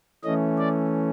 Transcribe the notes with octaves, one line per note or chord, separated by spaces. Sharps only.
E3 A3 C#4 D#5
D5